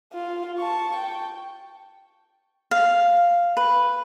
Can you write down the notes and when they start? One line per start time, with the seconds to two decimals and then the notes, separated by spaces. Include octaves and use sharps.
0.13 F4
0.58 A5 C#6
0.96 G5
2.71 F5
3.57 B4